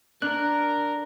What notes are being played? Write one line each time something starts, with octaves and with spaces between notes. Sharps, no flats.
D4 A#4 A#5 F#6